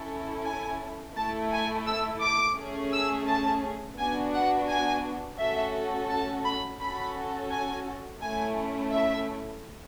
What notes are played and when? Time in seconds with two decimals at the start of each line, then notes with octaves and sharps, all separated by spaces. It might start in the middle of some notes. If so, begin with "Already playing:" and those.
Already playing: C#4 E4 A4
0.45 G#5
1.16 A3 E4 A4 A5
1.51 G#5
1.87 E6
2.21 D6
2.57 A3 C#4 G#4
2.92 E6
3.27 A5
3.98 B3 D4 F#4 G#5
4.34 F#5
4.68 G#5
5.39 A3 C#4 F#4 A4 E5
6.10 A5
6.44 B5
6.80 C#4 F#4 A4 B5
7.50 G#5
8.21 A3 C#4 E4 G#5
8.92 E5